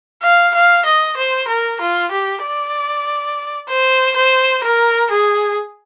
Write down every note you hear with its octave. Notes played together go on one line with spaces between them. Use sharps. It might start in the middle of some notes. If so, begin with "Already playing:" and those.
F5
F5
D#5
C5
A#4
F4
G4
D5
C5
C5
A#4
G#4